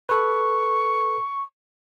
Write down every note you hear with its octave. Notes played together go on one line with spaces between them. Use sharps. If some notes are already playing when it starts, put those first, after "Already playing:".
A4 B4 C#6